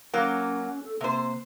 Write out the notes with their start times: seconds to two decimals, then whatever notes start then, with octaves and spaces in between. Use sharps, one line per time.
0.14 F#3 A#3 C#4
0.84 A4
1.01 C3 A#3 C5